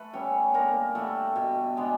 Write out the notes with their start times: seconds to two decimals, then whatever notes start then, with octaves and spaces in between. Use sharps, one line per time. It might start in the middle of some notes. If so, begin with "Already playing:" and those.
Already playing: A3 A4 B4
0.13 G3 B3 C#4 C#5
0.54 D3 A#3 A#4
0.95 G3 A3 B3 A4
1.36 B2
1.77 G#3 B3 D4